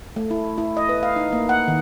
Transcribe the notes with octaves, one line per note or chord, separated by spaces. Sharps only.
A3
E4
E4
D#5
B4
F5
D#4
A#3
F#5
D#3